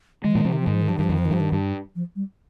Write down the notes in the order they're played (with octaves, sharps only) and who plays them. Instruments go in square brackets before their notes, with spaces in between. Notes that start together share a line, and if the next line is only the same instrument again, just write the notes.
[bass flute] D#3 [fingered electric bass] G#3
[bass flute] F3
[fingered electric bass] A#2 [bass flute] D#3
[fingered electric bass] C3 [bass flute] F3
[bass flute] D#3
F3
[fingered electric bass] G#2 [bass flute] D#3
[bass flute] F3
D#3
[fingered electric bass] G2 [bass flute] F3
[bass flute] D#3
[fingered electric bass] G2 [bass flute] F3
[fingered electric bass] F2 [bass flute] D#3
[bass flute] F3
D#3
[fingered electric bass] G2 [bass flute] F3
[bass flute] D#3
[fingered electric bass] G2
[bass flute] F3
G3